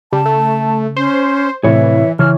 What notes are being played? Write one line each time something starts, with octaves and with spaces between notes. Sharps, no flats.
C#3 G3 A5
A3
C#4 C5
A2 C3 E3 C4 C#5 E5
C#3 E3 E4 C#5 F6